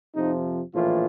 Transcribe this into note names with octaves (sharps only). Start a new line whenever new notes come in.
F2 C3 F3 D#4
A#1 A2 E3 F4